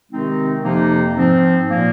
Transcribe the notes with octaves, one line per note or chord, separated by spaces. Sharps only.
C3 D#3 G#3 C4 D#4
F2 C3 F3 A#3 D#4
G#2 F3 C4
A#2 F3 A#3